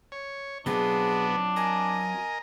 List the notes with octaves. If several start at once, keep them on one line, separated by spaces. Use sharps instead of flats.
C#5
B2 F#3 B3 C4 D4 F4 G#4
A#4 D#5 G#5